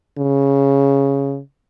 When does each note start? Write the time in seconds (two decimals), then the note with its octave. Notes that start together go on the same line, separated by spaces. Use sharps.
0.18 C#3